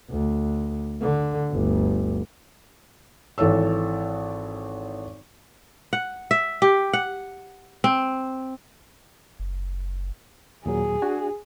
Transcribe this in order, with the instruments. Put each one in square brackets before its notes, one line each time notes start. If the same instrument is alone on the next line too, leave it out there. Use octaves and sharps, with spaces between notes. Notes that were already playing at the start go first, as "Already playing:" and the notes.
[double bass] D2
D3
G1 D2
[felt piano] G#1 E3 A4 C#5 E6
[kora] F#5
E5
G4
F#5
C4
[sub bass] F#1
[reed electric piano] D#2 A#2 F#3 [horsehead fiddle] G#4
[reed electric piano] D4 F#4 G#5